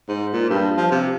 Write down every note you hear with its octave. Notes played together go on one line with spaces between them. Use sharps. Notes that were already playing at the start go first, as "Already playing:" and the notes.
G#2
A#2
G2
F3
C3